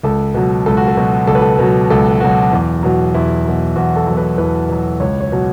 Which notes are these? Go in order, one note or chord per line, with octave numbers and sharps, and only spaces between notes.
C#2 A4
B2 F#3
C#2 A4
F#4
A4
B2 F#3
C#2 A4
B4
A4
B2 F#3
C#2 A4
B2 F#3 F#4
E2
B2 F#3
E2 E4
B2 F#3
E2 F#4
A4
B2 F#3
B4
E2 B4
B2 F#3
C#2 C#5
C#5
B2 F#3